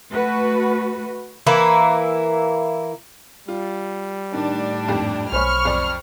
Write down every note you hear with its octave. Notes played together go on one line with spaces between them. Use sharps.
A3 F#4 B4
E3 A#3 E4
G3 F4
A2 D#3 D4
G#1 F2 G4
B1 C5 C#5 G#5 B5 C#6 F6
F2 D5